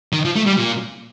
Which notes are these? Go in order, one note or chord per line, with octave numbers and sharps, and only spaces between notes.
D#3
F3
A3
G3
A#2